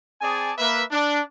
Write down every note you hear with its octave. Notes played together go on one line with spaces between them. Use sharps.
C4 G#4 D5 G#5 A5 D#6
A#3 B4 E5
D4